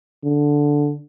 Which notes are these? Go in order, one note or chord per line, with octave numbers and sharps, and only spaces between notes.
D3